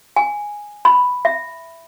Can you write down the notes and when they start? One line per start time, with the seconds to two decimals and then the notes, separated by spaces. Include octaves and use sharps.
0.16 G#5
0.85 B5
1.25 E5